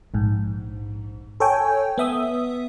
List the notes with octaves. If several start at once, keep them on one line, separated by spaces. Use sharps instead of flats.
A#1 G#2
A4 C#5 G5 G#5
B3 E5 D#6